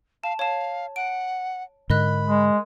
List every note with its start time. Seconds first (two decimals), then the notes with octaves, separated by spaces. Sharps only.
0.24 F5 A5
0.39 C#5 F5 A5
0.96 F#5 D7
1.90 G#2 D3 A#4 D#5 B5 F#6
2.26 G#3